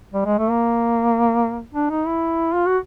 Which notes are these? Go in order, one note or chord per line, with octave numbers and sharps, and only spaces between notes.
G3
G#3
A3
A#3
D4
D#4
E4
F4
F#4